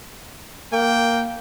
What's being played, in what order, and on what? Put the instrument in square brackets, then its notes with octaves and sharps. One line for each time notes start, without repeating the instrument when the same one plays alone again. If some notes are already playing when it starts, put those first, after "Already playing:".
[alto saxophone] A#3 [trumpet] G5